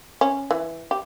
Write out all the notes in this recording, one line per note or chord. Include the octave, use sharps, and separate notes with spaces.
C#4
E3
G4